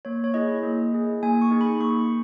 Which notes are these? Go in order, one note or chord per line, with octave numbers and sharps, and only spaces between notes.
A#3 C#5
C#5
E4 G#4 D#5
A#3
E4 G#4
A#3 G#5
C#6
D#4 G#4
B5
A#3 C#6